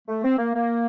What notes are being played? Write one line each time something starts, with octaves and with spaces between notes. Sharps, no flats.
A3
C4
A#3
A#3